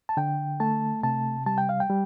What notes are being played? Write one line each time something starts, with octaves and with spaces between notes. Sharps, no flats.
A5
D3 G5
A3 A5
C3 A5
G3 A5
G5
F5
G5
G3